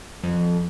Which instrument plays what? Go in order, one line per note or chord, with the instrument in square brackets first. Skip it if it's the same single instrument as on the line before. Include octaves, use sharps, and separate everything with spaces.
[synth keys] F2